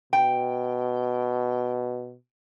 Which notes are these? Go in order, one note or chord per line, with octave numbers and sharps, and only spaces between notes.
B2 G5